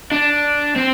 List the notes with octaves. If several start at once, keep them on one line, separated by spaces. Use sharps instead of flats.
D4
C4